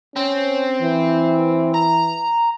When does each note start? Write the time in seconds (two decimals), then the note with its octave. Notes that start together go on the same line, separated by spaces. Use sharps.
0.16 C4 C#4
0.82 E3
1.75 A#5